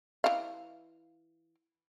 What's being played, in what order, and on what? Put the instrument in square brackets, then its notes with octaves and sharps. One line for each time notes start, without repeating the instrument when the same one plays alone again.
[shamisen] E3 D#4 F5